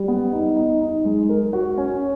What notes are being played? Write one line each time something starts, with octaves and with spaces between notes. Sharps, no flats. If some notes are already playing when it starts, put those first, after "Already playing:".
Already playing: G3
B3
D#4
D#4
D#4
G#3
A#4
F#4
C#4